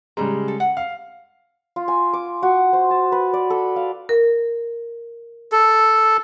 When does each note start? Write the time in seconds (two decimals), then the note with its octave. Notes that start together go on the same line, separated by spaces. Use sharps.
0.17 C#3 G3 G#3 A#5
0.48 A4
0.60 F#5
0.77 F5
1.76 F4
1.88 G#5
2.13 D6
2.43 F#4
2.73 C5
2.91 A5
3.12 B4
3.34 D5
3.50 A4
3.76 F5
4.09 A#4
5.52 A4